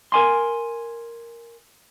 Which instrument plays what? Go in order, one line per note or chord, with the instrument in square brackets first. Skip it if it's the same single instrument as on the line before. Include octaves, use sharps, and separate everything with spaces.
[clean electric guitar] A#4 G#5 C6